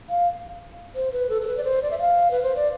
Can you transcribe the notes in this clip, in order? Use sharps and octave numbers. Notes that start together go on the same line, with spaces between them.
F5
C5
B4
A4
A4
B4
D5
C5
D5
E5
F5
B4
C5
D5